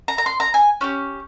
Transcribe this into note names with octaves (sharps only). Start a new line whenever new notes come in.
A#5
A#5
C6
A#5
G#5
C#4 E4 G4